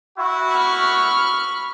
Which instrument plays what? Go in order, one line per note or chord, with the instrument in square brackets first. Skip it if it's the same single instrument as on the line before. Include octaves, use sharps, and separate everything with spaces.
[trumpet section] E4 F#4
[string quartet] B5 C#6 F6